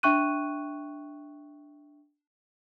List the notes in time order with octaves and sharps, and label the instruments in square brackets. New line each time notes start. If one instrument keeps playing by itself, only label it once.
[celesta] D4 E5 G5 C#6 F#6 D#7